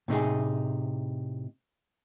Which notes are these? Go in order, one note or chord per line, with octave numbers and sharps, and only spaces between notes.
A2 C3 D#4 G#4